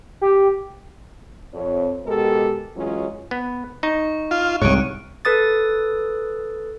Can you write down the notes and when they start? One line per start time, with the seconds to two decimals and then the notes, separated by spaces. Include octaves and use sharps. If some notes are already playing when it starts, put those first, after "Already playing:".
0.21 G4
1.54 F2 C#5
2.05 B2 G#3 G4 A4 A#4
2.75 E3 F#3 G#3 C#4 F4
3.31 B3
3.83 D#4 C#6
4.31 F4 F6
4.62 C2 G#2 C#5 F#6 D7 D#7
5.25 A4 B4 D#6 A6